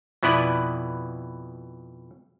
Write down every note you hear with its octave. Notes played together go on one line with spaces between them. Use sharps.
F2 B2 B3 E4 B4 D5